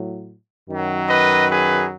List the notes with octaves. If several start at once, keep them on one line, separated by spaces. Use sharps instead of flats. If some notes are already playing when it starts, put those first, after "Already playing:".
Already playing: A2 F#3
F#2 D#3 F#3
B4 D#5
G#4 B4